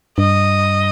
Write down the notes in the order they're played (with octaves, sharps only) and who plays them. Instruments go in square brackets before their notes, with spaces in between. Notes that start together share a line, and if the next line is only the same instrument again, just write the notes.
[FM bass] G2 [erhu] D#5